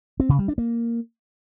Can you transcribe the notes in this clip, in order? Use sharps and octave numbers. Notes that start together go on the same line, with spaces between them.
C4
C#3
G3
D4
A#3